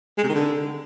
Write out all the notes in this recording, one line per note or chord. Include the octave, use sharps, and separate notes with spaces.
G#3
C3
D#3
D3